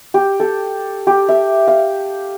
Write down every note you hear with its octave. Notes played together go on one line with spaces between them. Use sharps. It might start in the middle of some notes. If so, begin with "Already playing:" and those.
G4
A4
G4
E5
F5